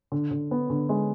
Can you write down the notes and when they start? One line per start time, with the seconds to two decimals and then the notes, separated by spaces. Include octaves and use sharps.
0.12 D3
0.31 D3
0.51 B3
0.70 D3
0.89 G#3